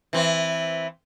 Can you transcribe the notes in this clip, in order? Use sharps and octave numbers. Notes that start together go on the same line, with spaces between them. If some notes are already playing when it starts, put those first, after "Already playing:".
E3 C4